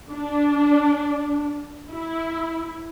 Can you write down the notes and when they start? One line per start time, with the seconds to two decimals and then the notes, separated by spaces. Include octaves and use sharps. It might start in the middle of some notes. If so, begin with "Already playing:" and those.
0.10 D4
1.90 E4